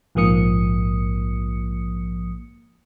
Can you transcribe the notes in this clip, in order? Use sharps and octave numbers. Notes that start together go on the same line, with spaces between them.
A#1 G#2 F3 A#3 D#6 C#7